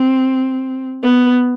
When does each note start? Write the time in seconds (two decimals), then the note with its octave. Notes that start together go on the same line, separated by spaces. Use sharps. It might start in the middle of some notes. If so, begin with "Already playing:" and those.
Already playing: C4
1.03 B3